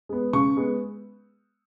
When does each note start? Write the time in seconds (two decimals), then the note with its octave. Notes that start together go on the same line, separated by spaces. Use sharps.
0.09 G#3 B3
0.33 C#3 C#6
0.57 G#3 B3